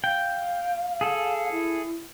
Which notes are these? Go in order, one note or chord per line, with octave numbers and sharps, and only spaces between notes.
F5 G5
G#4 A4
E4